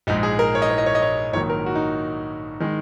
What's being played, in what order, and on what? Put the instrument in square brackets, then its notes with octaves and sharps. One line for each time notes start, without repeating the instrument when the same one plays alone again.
[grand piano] A#1 G#2 G#3 D#4
G#4
A#4
C#5
D#5
C#5
D#5
C#5
D#5
C#5
A#1 G#2 D#3 F#3 A#3 C#5
A#4
F#4
D#4
D#3 G#3